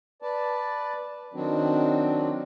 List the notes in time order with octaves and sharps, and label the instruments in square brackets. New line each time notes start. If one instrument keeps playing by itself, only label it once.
[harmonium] B4 D5 A5
D#3 F#3 C4 D4